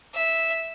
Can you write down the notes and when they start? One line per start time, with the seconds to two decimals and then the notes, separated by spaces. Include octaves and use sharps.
0.14 E5